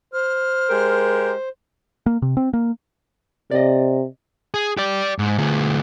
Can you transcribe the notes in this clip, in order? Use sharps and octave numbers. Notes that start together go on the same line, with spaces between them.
C5 F6
G#3 G4 A#4
A#3
C3
C4
A#3
C3 D5 D#5
G#4
G4 D5
G#2
D2 G#4